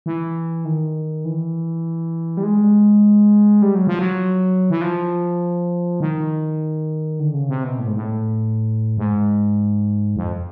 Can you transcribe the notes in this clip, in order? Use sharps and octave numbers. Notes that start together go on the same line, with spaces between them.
E3
D#3
E3
G3
G#3
G3
F#3
F3
F#3
E3
F3
D#3
D3
C#3
C3
B2
A2
G#2
A2
G#2
F2